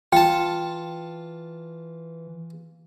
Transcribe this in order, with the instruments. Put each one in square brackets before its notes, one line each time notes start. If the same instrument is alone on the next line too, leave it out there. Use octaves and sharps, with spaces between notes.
[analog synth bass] E3 [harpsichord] F4 A5 [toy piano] G5